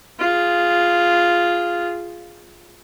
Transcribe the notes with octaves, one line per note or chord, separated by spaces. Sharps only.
F4 G#4